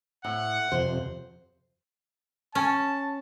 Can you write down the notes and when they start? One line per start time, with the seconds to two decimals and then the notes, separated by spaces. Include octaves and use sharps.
0.25 A2 F#5
0.72 F2 C3 C5
2.55 C#4 A5